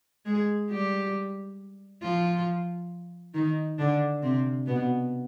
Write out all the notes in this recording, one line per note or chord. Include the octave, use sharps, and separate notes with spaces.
G#3 G#4
G3 G4
F3 F4
D#3 D#4
D3 D4
C3 C4
B2 B3